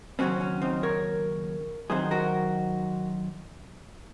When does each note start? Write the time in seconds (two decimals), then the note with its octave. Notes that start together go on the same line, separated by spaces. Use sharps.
0.19 D#2 C#3 F#3 C4 C#4
0.41 C#4
0.62 C4 D#4
0.83 A#4 C#5
1.90 F#2 D#3 F#3 C4 G#4 C5
2.11 F#4 A#4